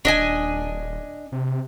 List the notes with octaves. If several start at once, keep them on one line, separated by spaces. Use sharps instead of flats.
D#1 D4 D#5 G#5
C3